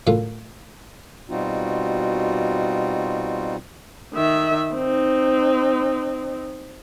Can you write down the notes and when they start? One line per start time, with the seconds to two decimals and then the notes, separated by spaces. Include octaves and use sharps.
0.07 F#2 A2 D3 F4
1.29 B2 G3 C4 D#4 F4 F#4
4.14 D#3 E5
4.74 C4 D#4